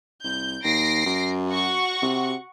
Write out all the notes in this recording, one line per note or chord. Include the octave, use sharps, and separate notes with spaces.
C2 G6
D#2 A#6 C7 D7
F#2
F#4 F#5 C#6
C3